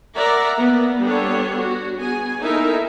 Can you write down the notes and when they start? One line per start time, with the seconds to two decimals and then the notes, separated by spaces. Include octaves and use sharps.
0.17 A#4 D5 E5 F#5 A#5
0.58 A#3 B3
1.01 G3 B3 D4 A4 C#5
1.58 F#4
1.98 B3 G#4 G#5
2.43 A#3 D#4 E4 A4 A#4 E5